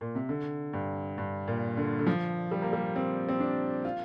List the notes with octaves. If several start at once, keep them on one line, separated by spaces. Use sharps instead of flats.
A#2
C3
D3
G2
G2
A#2
D3
D3
F3
G3
A#3
G3
C4
C4
D4
F4